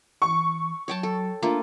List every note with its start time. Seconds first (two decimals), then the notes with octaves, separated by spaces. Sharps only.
0.22 E3 C#6
0.88 F#3 C#5 G5 A5
1.03 A4
1.42 A3 A#3 D4 F4